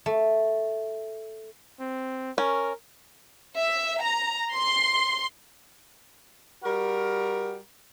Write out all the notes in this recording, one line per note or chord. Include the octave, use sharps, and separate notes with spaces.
A3
C4
C#4 A#4
E5
A#5
C6
G3 F#4 A#4